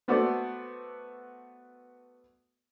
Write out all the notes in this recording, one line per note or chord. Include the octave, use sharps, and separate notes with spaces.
A3 B3 F#4 A4 C5 D5